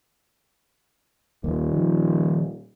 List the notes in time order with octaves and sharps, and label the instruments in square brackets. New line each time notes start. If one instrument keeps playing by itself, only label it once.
[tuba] D#1 [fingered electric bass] D#2 A#3
[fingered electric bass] D#3 F3